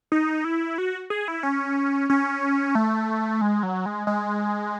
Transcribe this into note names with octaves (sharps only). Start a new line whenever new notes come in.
D#4
E4
F#4
G#4
E4
C#4
C#4
A3
G#3
F#3
G#3
G#3